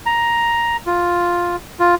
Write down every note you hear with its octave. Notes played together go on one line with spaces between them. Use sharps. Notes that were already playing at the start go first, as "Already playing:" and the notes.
A#5
F4
F4